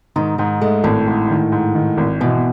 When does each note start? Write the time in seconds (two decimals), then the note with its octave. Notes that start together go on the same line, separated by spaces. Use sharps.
0.16 G#2 D#3
0.38 G#2 D#3
0.61 G#3 A3
0.84 G#1 A2
1.07 G#2
1.30 D#3
1.52 G#2
1.75 D#3
1.98 G#1
2.20 B2 E3